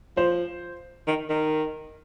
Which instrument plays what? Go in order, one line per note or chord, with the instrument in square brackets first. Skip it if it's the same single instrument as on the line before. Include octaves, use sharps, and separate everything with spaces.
[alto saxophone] F3 [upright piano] C5
[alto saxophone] D#3
D#3